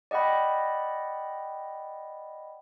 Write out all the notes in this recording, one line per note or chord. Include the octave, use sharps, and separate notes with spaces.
D5 D#5 F#5 G5 B5